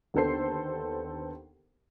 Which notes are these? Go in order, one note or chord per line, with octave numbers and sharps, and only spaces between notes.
D#2 D3 B3 A4 C5 C7